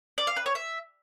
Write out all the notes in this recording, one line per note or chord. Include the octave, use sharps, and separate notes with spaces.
D5
F5
B4
C#5
E5